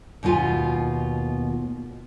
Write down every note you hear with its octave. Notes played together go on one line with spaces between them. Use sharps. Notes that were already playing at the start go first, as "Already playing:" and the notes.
D#2 B2 B3 F4 G#5